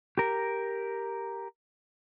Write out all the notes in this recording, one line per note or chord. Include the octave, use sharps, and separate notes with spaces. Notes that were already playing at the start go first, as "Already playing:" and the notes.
G4 A#4